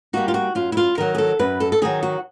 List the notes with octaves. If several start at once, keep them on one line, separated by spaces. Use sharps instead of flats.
G3 A#3 D#4 F#4
F4
F#4
F#2 F4
E4
F4
D#3 F#3 A#4
G#4
A4
F#2 B4
A4
A4
D#3 F#3 G#4
F#4